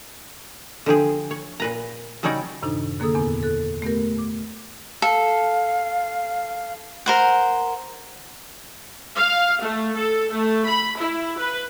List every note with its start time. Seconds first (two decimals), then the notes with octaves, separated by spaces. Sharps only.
0.86 D3 F3 G4 G#4
1.31 C#5
1.60 A#2 B4 A#5
2.23 C#3 F#3 G3 D#4 C#5 D5
2.62 F#2 A2 C3 D#3 D4 D#4
3.00 D3 A#3 G#4 A4 D#6 E6
3.15 E2 A#2 B3 C#4
3.43 A4 F#6
3.82 A3 B3 G4 A#4
4.18 D6
5.02 A4 F5
7.06 A#4 C5 F#5
9.16 F5
9.62 A3
9.96 A4
10.30 A3
10.66 B5
10.98 E4
11.38 B4